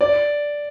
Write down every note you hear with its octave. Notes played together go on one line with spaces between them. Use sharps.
D5